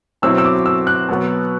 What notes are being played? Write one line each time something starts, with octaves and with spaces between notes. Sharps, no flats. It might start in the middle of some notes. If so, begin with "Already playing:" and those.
B2 F#3 C4 E4 E6
E6
D6
E6
F#6
B2 F#3 B3